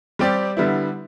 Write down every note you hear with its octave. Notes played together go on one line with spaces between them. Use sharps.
G3 C4 G4 D5
D3 G3 B3 E4